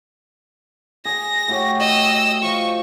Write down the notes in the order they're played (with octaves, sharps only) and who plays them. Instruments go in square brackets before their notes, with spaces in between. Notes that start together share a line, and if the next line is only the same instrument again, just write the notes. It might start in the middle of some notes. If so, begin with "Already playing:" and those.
[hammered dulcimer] G#4 [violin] A#6
[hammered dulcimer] A2 F#4 G4
[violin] D#5 E6 [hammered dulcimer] C#6
[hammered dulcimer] F3 [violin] C#6